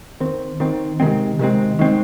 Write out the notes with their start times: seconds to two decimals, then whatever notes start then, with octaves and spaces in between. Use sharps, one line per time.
0.20 D#3 C4
0.60 D#3 C4
1.00 C3 D#3 G#3 C4
1.39 C3 D#3 G#3 C4
1.79 D#3 G#3 C4